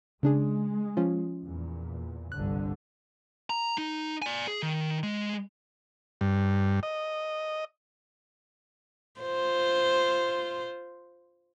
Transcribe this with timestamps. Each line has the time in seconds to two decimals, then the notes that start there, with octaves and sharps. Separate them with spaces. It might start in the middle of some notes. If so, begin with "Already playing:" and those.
0.23 C#3 G#3 D4 G#4
0.97 F3 C#4 F4
1.44 E2 A#2
2.32 G1 C2 D3 F#6
3.50 A#5
3.78 D#4
4.22 D5 G#5
4.48 G#4
4.63 D#3
5.03 G#3
6.21 G2
6.83 D#5
9.21 F4 C5